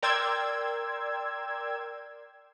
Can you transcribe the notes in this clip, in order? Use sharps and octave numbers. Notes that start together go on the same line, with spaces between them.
A#4 D5 G5 C6 E6 G#6